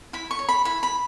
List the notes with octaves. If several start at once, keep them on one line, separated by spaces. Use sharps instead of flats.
E4 B5
C#6
C#5
B5
E4 B5
B5